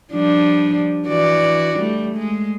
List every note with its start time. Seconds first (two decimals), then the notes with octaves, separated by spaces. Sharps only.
0.13 F3 G3 D4
1.07 E3 F#4 D5
1.77 G3 A3
2.16 G#3